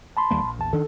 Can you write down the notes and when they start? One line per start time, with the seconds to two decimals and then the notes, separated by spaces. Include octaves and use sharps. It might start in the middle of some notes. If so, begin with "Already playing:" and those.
0.17 A5 B5 C6
0.31 D#2 G3 A#3
0.44 A#1
0.59 E2 A5
0.73 D#3 D4 A4